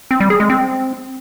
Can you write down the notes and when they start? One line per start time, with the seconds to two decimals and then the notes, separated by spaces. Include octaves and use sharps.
0.11 C4
0.20 G3
0.30 G#4
0.40 G#3
0.50 C4